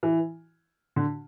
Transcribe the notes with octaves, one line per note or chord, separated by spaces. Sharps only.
E3
D3